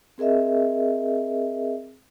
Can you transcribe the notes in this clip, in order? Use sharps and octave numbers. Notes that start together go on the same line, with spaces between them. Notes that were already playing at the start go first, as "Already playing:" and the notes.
C4 G#4 A#4 D#5 E5